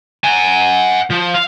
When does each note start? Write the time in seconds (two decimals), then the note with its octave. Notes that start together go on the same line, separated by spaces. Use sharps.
0.24 F#5 G#5
1.10 F3
1.34 F5